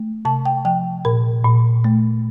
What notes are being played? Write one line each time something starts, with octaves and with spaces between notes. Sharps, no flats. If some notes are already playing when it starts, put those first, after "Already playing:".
Already playing: A3
C3 A5
G5
F3 G5
A#2 A#4
A#2
A3